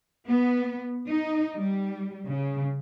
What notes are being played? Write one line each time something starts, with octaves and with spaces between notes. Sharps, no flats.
B3
D#4
G3
C#3